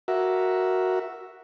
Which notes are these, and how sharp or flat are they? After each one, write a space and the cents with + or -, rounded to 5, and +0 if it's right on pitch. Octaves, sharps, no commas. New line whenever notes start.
F#4 +0 A#4 +0 E5 +0